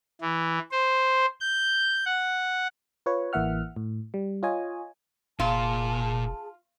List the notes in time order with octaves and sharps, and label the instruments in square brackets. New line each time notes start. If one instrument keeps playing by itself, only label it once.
[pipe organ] E3
C5
G6
F#5
[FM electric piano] F4 B4 C#5
A1 E3 A#3 E5 F#5 F6
A2
G3
F4 C#5 D#5 G#5
[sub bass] F1 [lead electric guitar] A#2 [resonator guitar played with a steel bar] F4 [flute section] G#4 A5